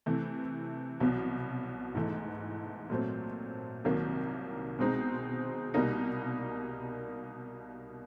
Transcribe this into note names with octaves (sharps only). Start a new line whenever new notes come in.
C3 E3 A3
C2 B2 F#3 B3
G#2 E3 A3
A#2 F#3 A3 C4
C2 C3 D#3 F#3 A#3
B2 G#3 C4 D#4
C2 B2 G3 A#3 D#4